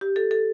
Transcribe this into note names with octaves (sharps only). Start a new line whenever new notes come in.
G4
A4
A4